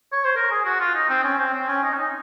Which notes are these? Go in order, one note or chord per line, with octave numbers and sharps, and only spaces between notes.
C#5
C5
A#4
G#4
F#4
F4
D#4
C4
C#4
C4
C4
C#4
D#4
C#4
D#4